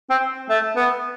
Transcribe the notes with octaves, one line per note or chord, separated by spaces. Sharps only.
C4
A3
B3